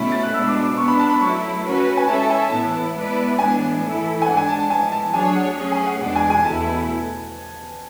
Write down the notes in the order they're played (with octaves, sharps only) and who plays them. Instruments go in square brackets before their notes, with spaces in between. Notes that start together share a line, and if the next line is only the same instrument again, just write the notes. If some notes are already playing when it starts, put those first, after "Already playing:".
Already playing: [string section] B2 A3 C#4 E4 [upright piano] B5
[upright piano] A6
F#6
[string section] B2 G#3 D4 [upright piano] E6
[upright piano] D6
D6
[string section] G#3 B3 D4 [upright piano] C#6
[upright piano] B5
A5
B5
[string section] F#3 A3 E4 [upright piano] C#6
[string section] A3 C#4 F#4 B4
[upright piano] G#5
[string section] G#3 C#4 E4 A4 E5 [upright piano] A5
[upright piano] A5
G#5
[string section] A2 E3 B3 E4 [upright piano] A5
[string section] G#3 B3 E4 B4 D5
[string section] A2 E3 G#3 B3 D4 [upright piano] G#5
[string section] E3 A3 E4 A4
[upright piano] G#5
[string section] G#2 G#3 D4 [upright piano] F#5
[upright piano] G#5
A5
A5
[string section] A2 E3 G#3 [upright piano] G#5
[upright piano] A5
[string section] F#3 A3 D4 G#4 C#5 [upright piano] G#5
[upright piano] F#5
[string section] A3 C#4 G#4
[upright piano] G#5
F#5
[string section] E2 B2 G#3 D4 [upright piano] F#5
[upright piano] G#5
G#5
[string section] E2 B2 A3 E4 [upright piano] A5